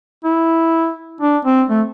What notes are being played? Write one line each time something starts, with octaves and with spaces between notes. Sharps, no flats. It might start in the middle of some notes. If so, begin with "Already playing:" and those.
E4
D4
C4
A3